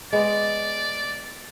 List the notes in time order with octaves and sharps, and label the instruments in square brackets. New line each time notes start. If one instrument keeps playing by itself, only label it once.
[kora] G#3 B3 [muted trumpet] D5